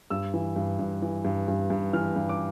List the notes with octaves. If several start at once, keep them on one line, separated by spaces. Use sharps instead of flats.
G2 E6
E3
G2
G2
E3
G2
G2
G2
E3 F6
G2
D6